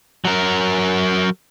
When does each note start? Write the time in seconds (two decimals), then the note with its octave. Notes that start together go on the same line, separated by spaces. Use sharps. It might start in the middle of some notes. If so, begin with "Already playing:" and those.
0.25 F#3 A#4